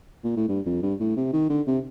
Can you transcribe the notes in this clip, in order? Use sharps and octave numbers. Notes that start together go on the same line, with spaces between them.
A#2
A2
G2
F2
G2
A2
C3
D#3
D3
C3